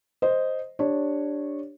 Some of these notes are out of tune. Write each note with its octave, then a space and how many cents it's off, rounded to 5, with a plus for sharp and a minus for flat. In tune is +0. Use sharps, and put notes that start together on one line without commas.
C5 +0 D#5 +0
D4 +0 G4 +0 C#5 -15